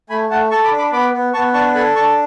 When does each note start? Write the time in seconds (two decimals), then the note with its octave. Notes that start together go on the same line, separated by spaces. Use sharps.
0.10 A3 G#5 B5
0.30 A3 F#5 A5
0.51 A4 A5 C#6
0.65 B5 D6
0.71 D4
0.78 B5 D6
0.92 B3 B5 D6
1.13 B3
1.33 B3 A5 C#6
1.54 D4 A5 C#6
1.75 A4 G#5 B5
1.95 D4 A5 C#6